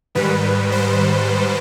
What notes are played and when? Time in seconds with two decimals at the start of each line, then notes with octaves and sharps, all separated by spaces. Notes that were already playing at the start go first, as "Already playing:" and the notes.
0.15 G#2 D#3 G3 B4
0.72 C5